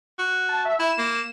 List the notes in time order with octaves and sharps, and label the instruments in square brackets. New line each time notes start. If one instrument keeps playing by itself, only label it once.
[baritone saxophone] F#4
[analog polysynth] A5
E5
[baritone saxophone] E4 [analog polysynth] E7
[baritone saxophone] A#3